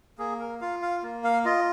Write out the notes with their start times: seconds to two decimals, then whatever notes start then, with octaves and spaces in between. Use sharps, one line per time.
0.18 A#3 G#4
0.40 A#4
0.61 F4 F5
0.82 F5
1.03 A#3
1.24 F5
1.45 F4 D#5